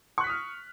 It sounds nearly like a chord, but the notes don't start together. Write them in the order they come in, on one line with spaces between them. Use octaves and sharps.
C#6 F#6 B6 D#6 F6